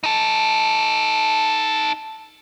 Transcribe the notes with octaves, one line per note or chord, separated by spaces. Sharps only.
D#4 A4